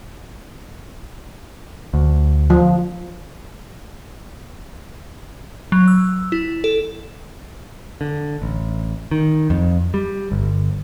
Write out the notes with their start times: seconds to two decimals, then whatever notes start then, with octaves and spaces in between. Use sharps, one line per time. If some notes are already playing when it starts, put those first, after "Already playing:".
1.94 D2
2.50 F3
5.72 F#3
5.88 E6
6.32 E4
6.64 A4
8.01 D3
8.42 A1
9.11 D#3
9.50 F2
9.94 G3
10.32 G1